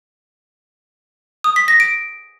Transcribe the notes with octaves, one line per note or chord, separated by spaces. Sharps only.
D#6
B6
A#6
D7